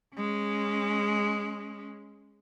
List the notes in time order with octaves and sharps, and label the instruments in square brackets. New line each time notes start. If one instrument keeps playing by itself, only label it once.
[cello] G#3 C#4